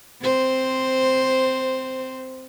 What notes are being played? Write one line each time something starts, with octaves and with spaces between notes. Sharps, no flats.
C4 C5